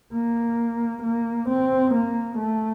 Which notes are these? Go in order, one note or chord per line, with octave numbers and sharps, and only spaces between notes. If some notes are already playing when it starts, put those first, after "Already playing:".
A#3
A#3
C4
A#3
A3